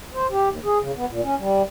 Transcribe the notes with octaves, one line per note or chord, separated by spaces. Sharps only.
C5
G4
D#2
G#4
C#3
B3
A#2
C#4
G3